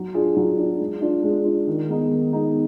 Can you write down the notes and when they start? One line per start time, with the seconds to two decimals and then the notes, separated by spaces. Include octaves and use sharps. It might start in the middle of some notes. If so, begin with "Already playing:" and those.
Already playing: F#3
0.14 D4 F4 G#4
0.36 F#3
0.58 D4 F4 G#4
0.80 G#3
1.01 D4 F4
1.23 G#3
1.45 D4 F4
1.67 D#3
1.89 G#3 B3 D#4
2.11 D#3
2.33 G#3 B3 D#4